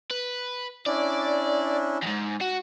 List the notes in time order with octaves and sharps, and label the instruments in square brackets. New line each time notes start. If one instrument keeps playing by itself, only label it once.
[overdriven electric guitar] B4
[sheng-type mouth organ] C#4 D4 E4 [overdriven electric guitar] D5
[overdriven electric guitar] E2 G#2
F#4